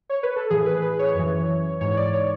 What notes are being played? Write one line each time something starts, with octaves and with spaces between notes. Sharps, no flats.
C#5
B4
A4
A2 E3 G#4
B4
B4
C#5
F#2 E3
G#2 E3 C#5
D5
C#5